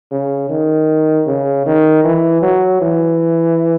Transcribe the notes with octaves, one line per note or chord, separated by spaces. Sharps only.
C#3
D#3
C#3
D#3
E3
F#3
E3